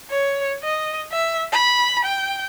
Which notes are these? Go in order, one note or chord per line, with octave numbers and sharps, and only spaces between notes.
C#5
D#5
E5
B5
G5